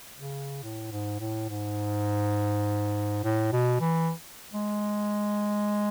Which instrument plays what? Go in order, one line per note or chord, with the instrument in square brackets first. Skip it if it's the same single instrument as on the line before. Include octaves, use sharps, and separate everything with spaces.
[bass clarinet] C#3
A2
G#2
A2
G#2
A2
B2
E3
G#3